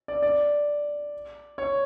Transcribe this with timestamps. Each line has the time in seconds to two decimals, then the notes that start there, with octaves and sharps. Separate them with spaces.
0.08 D5
0.22 D5
1.58 C#5